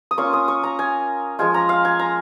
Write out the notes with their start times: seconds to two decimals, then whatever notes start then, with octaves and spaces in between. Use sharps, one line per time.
0.11 D#6
0.18 A#3 C#4 F4 C#6
0.33 D#6
0.48 C#6
0.64 A#5
0.79 G#5
1.39 F3 G#3 F4 G#5
1.54 A#5
1.69 F5
1.85 G#5
1.99 A#5